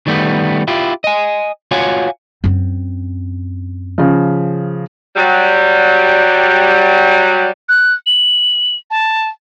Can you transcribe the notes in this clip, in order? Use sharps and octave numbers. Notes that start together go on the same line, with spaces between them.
D#3 G3 A3 B3
E4 F4 G4
D#5 G#5
F4 F#4 C#5 F5 F#5 G#5
F#2 C4
C#3 F3
F#3 G3
F#6
F#7
A5